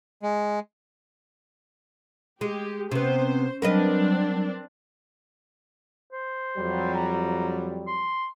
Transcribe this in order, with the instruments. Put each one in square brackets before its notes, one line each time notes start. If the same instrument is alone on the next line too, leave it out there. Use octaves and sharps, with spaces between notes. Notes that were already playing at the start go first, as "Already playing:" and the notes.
[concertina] G#3
[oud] G#3 [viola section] G4
[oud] C3 B3 [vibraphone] C#4 [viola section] C5
[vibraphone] F#3 G3 [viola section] C4 D4 [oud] A#4 B4 D#5
[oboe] C5
[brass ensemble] F2 F#3 G3
[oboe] A#5
C6